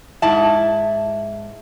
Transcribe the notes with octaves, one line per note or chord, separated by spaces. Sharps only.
G#2 E4 E5 A5